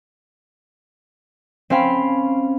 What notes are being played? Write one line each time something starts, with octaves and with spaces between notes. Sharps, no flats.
C4 C#4 C5 F5 G5 B5